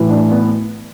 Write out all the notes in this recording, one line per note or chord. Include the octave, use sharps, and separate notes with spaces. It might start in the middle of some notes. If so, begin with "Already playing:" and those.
Already playing: A2 E3
D4
B3